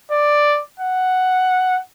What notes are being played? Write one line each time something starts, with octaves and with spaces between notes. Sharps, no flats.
D5
F#5